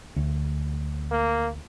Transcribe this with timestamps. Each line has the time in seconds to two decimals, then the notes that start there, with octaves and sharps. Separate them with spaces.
0.16 D2
1.11 A#3